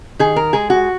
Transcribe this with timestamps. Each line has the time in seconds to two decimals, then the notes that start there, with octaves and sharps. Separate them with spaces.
0.19 D#3 G#4
0.36 A#4
0.53 G#3 G#4
0.70 F#4